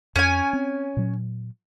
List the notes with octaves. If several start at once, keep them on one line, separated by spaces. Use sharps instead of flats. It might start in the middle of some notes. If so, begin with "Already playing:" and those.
F2 C#4 G#5
C4
A#2 F#3